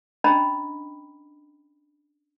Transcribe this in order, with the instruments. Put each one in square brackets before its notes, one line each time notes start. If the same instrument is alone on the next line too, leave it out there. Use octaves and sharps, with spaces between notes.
[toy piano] C#4 D4 D#5 G5 A#5 B5